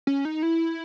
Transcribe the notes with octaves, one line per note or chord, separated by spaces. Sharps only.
C#4
D#4
E4